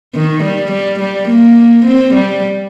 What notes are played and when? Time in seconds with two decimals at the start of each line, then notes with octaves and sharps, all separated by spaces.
0.15 D#3
0.44 G3
0.72 G3
1.00 G3
1.28 A#3
1.86 C4
2.14 G3